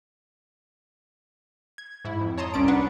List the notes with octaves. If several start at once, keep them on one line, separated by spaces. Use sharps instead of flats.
G#6
G#2 E4
F2
C#5 A5 A#5 C6 D#6
C2 C#4 D5 D7
D4 B4 F#5